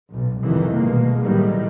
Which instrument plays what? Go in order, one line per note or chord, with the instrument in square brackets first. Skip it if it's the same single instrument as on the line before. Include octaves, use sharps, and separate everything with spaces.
[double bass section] B1
C2 F2 D#3 E3
B2 G#3 A#3
A2 D#3 F#3 G3